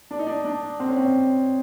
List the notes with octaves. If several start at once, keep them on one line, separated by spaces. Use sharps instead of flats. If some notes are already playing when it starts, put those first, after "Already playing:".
D4
D#4
D4
D4
C4
C#4
C4